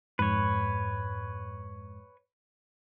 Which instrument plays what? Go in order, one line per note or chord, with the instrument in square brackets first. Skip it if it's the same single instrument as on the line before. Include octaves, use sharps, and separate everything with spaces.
[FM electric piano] F2 G#2 [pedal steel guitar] B4 C#5